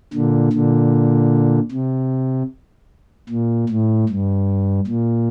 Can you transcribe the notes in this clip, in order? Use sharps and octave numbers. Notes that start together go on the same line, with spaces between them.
A#2 D3
A#2 D3
C3
A#2
A2
G2
A#2